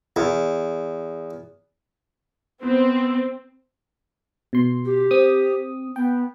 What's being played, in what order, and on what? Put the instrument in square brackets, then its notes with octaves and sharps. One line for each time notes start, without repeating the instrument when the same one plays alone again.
[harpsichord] E2
[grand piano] B3 [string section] C4
[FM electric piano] B2 C6
[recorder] G4
[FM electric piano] C4 D#6
[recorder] B3 [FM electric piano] G5